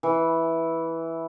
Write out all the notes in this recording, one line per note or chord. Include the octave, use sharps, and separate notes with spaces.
E3